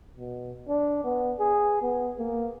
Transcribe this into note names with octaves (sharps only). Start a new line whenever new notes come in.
B2
D4
B3
G#4
B3
A#3